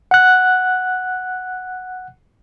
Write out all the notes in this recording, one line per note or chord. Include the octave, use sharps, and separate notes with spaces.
F#5 F#6